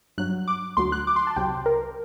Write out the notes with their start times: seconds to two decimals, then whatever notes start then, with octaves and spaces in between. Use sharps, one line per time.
0.18 G2 F#3 F#6
0.48 D6
0.77 D2 D3 F#3 C6
0.92 F#6
1.07 D6
1.16 C6
1.27 A5
1.36 C2 C3 F#3 G5
1.66 A#4